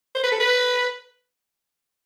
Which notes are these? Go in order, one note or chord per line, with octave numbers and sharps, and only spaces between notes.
C5
B4
A4
B4